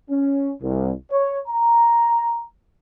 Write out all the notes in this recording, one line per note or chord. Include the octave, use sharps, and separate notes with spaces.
C#4
C2
C#5
A#5